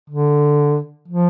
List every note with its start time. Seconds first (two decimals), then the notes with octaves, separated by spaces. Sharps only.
0.10 D3
1.08 F3